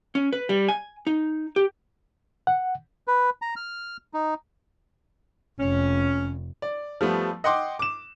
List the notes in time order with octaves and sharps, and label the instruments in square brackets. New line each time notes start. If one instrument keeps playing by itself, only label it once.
[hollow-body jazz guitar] C#4
B4
G3
G#5
D#4
G4
[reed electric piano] F#5
[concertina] B4
A#5
F6
D#4
[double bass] F1 [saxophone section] C#4
[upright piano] D5
F3 G3 A3 B3
D#5 F#5 G5 C6 D6
D6 E7